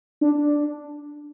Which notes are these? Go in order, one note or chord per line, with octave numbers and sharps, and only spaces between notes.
D4